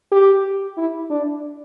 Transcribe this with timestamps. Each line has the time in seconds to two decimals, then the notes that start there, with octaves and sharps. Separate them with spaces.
0.12 G4
0.77 E4
1.10 D4